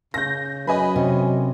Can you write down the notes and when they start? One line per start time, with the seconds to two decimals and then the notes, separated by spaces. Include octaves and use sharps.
0.14 C#3 G6 A#6
0.67 F#2 B4 D#5 G#5 B5
0.96 C3 C#4